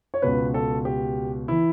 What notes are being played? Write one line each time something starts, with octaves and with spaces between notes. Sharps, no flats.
C#5
C#2 B2 B4
A4
G4
E3 E4